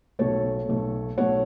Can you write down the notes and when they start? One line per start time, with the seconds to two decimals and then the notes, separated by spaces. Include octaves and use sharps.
0.19 B1 B2 A3 A4 C#5
0.69 B1 B2 A3
1.18 B1 B2 A3 C#5 F#5